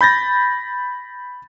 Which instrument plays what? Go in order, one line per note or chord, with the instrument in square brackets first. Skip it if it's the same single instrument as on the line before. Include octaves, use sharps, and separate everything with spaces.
[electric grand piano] B5 G6 A6 A#6